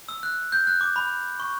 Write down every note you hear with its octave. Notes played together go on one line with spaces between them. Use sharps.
E6
F#6
G6
F#6
D6
B5
C#6